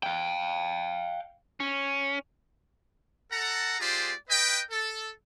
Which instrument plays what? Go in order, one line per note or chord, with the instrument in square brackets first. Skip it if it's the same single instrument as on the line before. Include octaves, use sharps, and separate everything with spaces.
[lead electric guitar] F5 G5
C#4
[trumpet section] A4 F#5 A#5
A3 F4 G4 G#4 C5 D5
B4 D#5 G5
A4